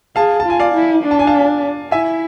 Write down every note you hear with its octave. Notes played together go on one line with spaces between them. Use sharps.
G#4 F5 A5
A5
F4 G#5
D5 F5
E4
D4
A5
G#5
F5 A5
E4 E5 G#5